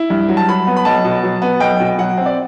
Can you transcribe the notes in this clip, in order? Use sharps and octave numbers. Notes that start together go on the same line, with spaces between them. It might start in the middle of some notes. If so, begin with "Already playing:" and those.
Already playing: E4
G2
F#3
A5
F#3 B5
B3
B5
B1 A5
B2
F#3
B3
B1 G5
B2
F#3 F#5
C4
D5